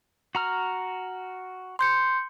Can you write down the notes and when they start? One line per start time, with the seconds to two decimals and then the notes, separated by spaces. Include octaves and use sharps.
0.35 F#4 A#5 F6
1.79 C6 G6 C#7